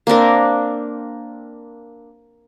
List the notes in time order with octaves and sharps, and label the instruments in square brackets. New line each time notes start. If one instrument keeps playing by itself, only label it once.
[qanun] A#3 C4 D4 A#4